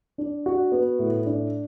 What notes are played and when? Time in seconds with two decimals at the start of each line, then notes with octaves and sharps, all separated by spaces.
0.18 D4
0.46 F#4
0.72 B3
0.99 A2
1.26 D4